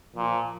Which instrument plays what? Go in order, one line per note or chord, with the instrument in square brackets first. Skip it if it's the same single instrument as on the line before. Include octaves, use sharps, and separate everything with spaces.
[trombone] A#2 [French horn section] F3